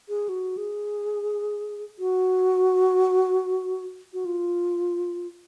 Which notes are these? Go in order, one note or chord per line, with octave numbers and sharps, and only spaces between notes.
G#4
F#4
G#4
F#4
F#4
F4